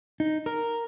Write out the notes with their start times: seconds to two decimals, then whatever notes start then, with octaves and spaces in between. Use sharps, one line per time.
0.20 D#4
0.46 A#4